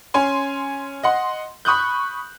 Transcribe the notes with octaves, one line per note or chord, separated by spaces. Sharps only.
C#4 G#5 C6
D#5 F#5 C6
B5 C#6 D#6 F#6 G6